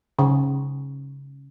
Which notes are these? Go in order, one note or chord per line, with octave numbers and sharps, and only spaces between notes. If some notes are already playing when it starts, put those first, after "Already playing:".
C#3